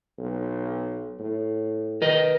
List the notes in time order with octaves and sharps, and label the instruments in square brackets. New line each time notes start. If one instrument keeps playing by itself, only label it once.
[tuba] B1
A2
[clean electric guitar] A#4 B4 D#5